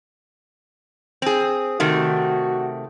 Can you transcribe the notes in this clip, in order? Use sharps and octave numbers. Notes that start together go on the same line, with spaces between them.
C4 G#4
C3 D#3 A3 F#4